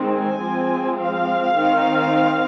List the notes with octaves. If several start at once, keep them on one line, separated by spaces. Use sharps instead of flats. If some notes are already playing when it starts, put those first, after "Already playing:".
Already playing: D#3 G#3 C4
G#5
F3 G#3 C4
F5
D#3 C4